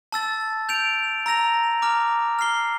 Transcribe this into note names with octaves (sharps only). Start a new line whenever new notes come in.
A5 E6 A6
G6 D7 F7
A#5 E6 A#6 F7
A#5 D6 F6
F6 C7 G7